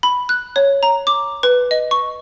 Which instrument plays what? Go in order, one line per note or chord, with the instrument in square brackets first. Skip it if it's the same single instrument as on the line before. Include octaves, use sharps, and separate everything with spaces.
[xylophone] B5
F#6
C#5
A#5
D6
B4
D#5
C#6